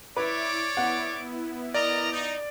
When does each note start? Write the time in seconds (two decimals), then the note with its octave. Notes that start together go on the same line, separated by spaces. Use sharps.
0.16 E4 B4 C#5 D5 E5 D6
0.77 B3 E4 F#5
1.74 A#4 D5 D#5 A#5
2.11 D#4